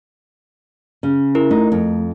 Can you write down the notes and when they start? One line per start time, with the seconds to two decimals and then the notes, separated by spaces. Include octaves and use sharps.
1.03 C#3
1.35 E4 A#4
1.51 A3 D#4
1.72 F2